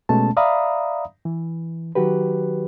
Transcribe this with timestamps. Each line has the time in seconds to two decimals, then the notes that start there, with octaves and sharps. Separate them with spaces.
0.09 B2 G#3 A3 C#4 A5
0.37 D5 E5 F5 A#5 B5 D#6
1.25 E3
1.95 D#3 F#3 F#4 G4 B4